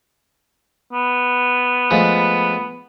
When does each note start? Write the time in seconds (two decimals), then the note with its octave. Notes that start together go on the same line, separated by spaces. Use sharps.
0.93 B3
1.91 F3 G#3 A3